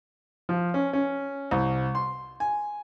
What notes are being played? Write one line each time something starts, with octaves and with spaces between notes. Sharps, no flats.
F3
C#4
C#4
C2
C6
G#5